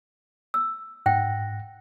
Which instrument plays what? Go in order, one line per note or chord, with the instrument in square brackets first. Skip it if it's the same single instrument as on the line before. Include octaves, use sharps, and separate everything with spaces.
[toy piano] E6
[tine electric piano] G#2 F#6 A#6 [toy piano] F#5 G5